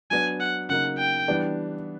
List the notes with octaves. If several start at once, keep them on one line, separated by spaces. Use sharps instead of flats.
F#3 B3 D4 G#5
F#5
C#3 F#3 A#3 D#4 F#5
G5
E3 G3 B3 D4